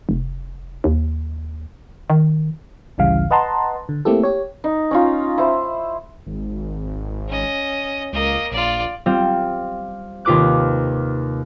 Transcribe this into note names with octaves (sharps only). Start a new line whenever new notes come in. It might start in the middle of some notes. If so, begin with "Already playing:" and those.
F1
D#2
D#3
A1 D2 C#3 E3 G3 F5
B4 D#5 F#5 A5 A#5 C6
D3
A3 A#3 C4 E4 G4 A4
G4 C#5
D#4
C#4 D#4 F4
E4 C5
G#1
C#4 D#5
C#2 A#3 D#5
A#1 F4 D5
G3 C4 F4 F5
D#2 C3 F4 B4 D6 F#6